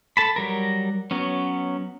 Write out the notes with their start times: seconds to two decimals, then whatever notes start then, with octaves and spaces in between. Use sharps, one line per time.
0.17 A4 A5 B5
0.36 F#3 G3 A#4
1.11 F#3 B3 C#4